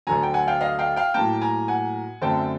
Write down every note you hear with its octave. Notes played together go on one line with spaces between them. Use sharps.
D2 D3 F#3 G#5 A#5
G5
F#5 G#5
F5 G5
D#5 F5
F5 G5
F5 G5
A2 F#3 A#3 G5 A5
G#5 A#5
F#5 G#5
F#2 D3 F#3 A3 C4 G5 A5